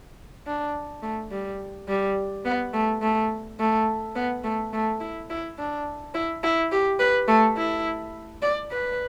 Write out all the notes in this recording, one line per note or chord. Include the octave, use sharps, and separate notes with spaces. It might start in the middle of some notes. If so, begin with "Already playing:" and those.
D4
A3
G3
G3
B3
A3
A3
A3
B3
A3
A3
E4
E4
D4
E4
E4
G4
B4
A3
E4
D5
B4